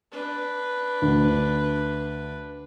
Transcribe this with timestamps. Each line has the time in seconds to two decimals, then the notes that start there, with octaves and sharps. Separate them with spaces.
0.12 D4 B4
1.02 D2